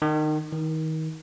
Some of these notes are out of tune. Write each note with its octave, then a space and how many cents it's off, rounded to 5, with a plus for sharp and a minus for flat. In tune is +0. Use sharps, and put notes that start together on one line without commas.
D#3 -20
D#3 +30